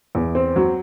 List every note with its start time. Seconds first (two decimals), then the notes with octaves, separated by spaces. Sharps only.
0.15 E2
0.35 C4
0.56 F#3